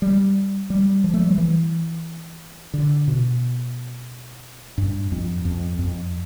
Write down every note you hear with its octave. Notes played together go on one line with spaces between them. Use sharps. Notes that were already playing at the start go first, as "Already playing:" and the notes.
G3
G3
F3
A3
G3
F3
E3
D3
B2
G2
F2
F2
F2